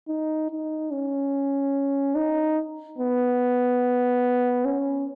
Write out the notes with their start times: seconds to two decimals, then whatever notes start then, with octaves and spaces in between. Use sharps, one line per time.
0.08 D#4
0.50 D#4
0.91 C#4
2.15 D#4
2.98 B3
4.65 C#4